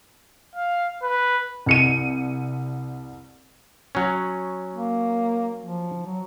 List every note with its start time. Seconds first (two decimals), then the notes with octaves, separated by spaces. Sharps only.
0.55 F5
1.03 B4
1.66 C2 C#7 D#7
3.95 F#3 C#4
4.75 A#3
5.63 F3
6.06 F#3